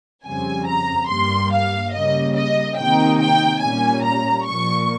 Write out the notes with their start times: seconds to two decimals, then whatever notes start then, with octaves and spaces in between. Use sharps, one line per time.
0.24 F2 C#3 G3 C4 G#5
0.67 A#5
1.09 G2 G3 A#3 C6
1.52 F5
1.93 C#3 G3 A#3 D#5
2.36 D#5
2.78 C3 D#3 A#3 D#4 G5
3.20 G5
3.61 A#2 G3 A#3 C#4 G#5
4.04 A#5
4.46 A#2 F3 A#3 C#6